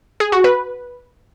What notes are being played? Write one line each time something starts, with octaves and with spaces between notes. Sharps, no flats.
G#4
F#4
B4